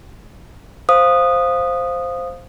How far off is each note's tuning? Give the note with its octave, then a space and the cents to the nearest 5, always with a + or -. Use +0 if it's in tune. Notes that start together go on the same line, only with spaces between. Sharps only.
C5 +0 F5 +0 D#6 -15